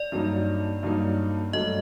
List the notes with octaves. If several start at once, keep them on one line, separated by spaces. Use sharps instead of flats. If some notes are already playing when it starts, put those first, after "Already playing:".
Already playing: D5
G2 F#3 A#3 D#4
G2 F#3 A#3 D#4
G2 F#3 A3 D4 D#5